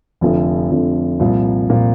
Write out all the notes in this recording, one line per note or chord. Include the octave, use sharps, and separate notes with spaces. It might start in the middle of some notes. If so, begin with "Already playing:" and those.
F1 F2 D3 F3
F1 F2 D3 F3
C2 A#2 F3
A#2 F3